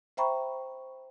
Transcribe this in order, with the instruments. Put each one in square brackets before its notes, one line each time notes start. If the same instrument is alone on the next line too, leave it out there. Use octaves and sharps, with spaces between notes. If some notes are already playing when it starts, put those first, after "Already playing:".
[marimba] C5 E5 G5 A#5 B5 C#6